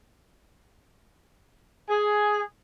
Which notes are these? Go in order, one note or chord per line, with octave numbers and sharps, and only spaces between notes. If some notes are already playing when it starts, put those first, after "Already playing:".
G#4